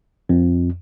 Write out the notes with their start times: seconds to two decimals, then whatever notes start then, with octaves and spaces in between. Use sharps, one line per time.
0.29 F2